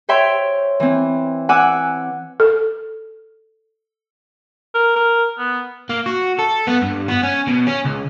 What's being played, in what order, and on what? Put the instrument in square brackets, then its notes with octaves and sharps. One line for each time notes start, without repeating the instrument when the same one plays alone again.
[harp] C5 C#5 E5 G5 C6
E3 C4
F#5 G#5 D6 E6 F#6
[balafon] A4
[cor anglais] A#4
A#4
B3
[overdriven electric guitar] A#3
F#4
A4
B3
G2
B3
C#4
B2
C#4
C#2